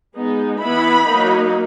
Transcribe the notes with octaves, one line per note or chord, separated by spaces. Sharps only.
G#3 B3 D#4
E3 B3 E4 B5
F#3 A#3 D#4